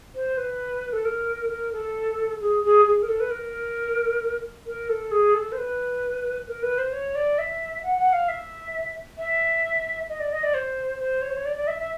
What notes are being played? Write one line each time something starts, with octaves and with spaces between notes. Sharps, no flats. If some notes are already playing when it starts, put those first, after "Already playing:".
C5
B4
A4
A#4
A#4
A4
G#4
G#4
G#4
A#4
A4
B4
A#4
A#4
A4
G#4
A4
C5
B4
A#4
B4
C5
C#5
D5
E5
F#5
F#5
F5
E5
E5
D#5
D5
D#5
D5
C5
C5
C#5
C5
C#5
D5
D5
E5
E5